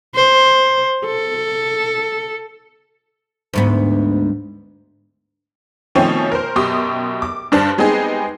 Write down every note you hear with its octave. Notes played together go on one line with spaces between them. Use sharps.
C5
A4
D2 G#2 B3
B2 D#3 F3 A3 C4 C#4
A#4 C5
F#2 B2 G4 C6 D#6
D6
G2 D4 C5 A5
G3 G#3 B3 C4 D#4 G#4